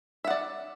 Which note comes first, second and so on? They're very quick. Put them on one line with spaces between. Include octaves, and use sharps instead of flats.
E5 F#5 D5